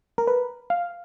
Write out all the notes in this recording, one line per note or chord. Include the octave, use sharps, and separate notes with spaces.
A#4
B4
F5